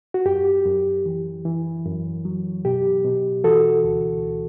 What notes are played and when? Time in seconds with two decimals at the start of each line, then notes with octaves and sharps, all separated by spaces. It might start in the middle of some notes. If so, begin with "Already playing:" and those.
0.14 F#4
0.25 F#2 G4
0.66 F#2
1.06 E3
1.45 E3
1.85 F#2
2.25 F#3
2.65 B2 G4
3.05 B2
3.44 E3 F#4 A4
3.84 D2